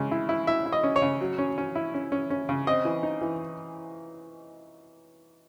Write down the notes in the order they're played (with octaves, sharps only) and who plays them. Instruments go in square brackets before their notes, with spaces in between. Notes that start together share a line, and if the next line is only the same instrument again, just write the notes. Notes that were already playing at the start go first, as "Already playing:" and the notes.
Already playing: [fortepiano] C#3 G#3
E4
E4
E4 E5
E4
D#5
C#4
C#5
C#3
F#3
C#4
C#4
E4
C#4
C#4
C#4
C#3
C4 D#5
E3
D#4
E3